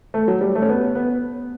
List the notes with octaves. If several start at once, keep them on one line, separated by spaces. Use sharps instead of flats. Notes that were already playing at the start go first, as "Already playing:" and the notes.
A3
F#3
G3
A3
C#4
B3
B3